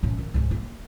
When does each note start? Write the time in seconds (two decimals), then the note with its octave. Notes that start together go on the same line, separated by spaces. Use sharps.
0.03 A2 C#4
0.18 D#3
0.34 C#2 G#2
0.51 A#3